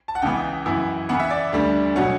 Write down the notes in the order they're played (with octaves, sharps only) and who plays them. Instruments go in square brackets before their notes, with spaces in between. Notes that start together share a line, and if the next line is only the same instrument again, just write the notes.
[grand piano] A5
F#5
C#2 C#3 E3 B3 G5
F#2 E3 B3 E4
C#3 E3 B3 F#5
E5
D5
D2 D3 G3 D4
B2 F#3 C#4 F#5